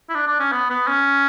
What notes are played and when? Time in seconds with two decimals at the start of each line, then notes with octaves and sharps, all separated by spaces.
0.09 E4
0.15 D4
0.27 D4
0.39 C#4
0.52 B3
0.70 B3
0.88 C#4